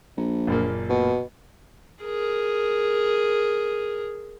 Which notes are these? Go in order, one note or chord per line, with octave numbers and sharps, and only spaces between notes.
A#1
F#1 A#2 A#3
B2
G#4 A#4